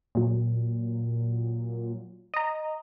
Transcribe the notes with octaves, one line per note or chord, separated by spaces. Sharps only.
A#2 F#3
D#5 A#5